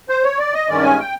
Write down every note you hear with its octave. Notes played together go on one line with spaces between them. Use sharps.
C5
C#5
D5
D#5
G2 D#3 G#3 C#4 D5
G#5
G5